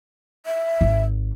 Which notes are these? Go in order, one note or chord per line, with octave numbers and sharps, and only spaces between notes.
E5
G#1